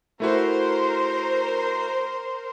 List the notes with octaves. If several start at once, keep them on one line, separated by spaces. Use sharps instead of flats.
A3 E4 F#4 A#4 C5